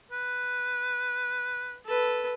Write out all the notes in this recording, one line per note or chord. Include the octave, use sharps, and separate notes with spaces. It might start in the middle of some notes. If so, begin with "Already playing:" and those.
B4
A4 B4